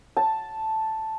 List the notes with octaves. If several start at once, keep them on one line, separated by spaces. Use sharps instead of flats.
A5